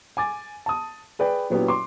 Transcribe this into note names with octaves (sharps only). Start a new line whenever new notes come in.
G#5 D6 A6
A5 D#6
G#4 B4 D5 G5
A#2 F#3 B3 C#4 E4 G4
C6 D6